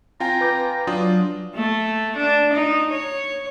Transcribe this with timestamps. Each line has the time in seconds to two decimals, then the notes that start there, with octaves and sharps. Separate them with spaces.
0.20 C4 F4 G5 G#5 A#5
0.41 B4 D6 G6
0.87 F#3 D4 F4 D#6
1.55 A3
2.17 D4
2.54 D#4
2.91 C#5